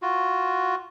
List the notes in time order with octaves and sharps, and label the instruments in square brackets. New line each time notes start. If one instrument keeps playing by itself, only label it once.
[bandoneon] F4 F#4